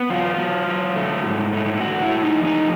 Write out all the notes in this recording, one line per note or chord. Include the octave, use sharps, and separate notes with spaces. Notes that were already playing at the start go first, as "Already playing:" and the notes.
Already playing: B3
F#3 F4
F#3
F#3
A3
G#2
A3
G#2 F#4
E4
A3
D#4
F3
D#4